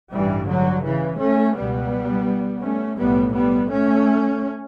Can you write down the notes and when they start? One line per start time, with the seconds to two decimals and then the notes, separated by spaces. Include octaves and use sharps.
0.12 A1 G2 E3 G3
0.47 D3 F#3
0.84 C#3 E3
1.19 A3 C#4
1.55 C#2 B2 G3 B3
2.62 A3 C#4
2.98 B1 A2 G3 B3
3.33 G3 B3
3.70 A3 C#4